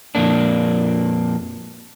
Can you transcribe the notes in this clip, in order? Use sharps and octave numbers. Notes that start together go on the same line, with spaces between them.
F2 A#2 A#3 D4